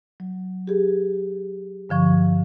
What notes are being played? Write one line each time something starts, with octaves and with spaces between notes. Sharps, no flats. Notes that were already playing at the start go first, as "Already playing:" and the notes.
F#3
G4 G#4
G2 D3 F3 C#6